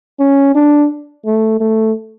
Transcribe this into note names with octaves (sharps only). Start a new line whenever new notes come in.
C#4
D4
A3
A3